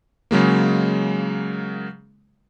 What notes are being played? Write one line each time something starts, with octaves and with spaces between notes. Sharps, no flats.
C#3 F#3 G#3 A#3